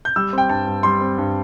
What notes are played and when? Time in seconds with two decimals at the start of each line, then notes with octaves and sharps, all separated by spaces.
0.05 G6
0.16 G3 E6
0.33 C4 G5
0.49 G2 A5
0.67 G2
0.83 G3 C6
1.01 C4
1.18 G2